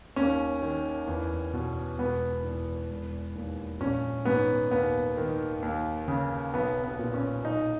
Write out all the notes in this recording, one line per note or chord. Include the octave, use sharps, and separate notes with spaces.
D#2 C#4
D#3
E2
B2
E1 B3
E2
E1
D#2
A#1 C#4
G#2 B3
D#2 B3
D#3
D#2
C#3
B1 B3
B3
A#2
C#4
B1 D#4